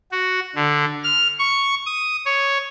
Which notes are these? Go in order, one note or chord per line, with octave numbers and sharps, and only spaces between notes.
F#4
D3
F6
C#6
D#6
C#5